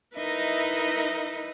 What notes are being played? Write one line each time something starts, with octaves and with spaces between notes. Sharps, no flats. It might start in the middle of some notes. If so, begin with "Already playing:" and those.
D#4 E4 A#4 B4 D#5 E5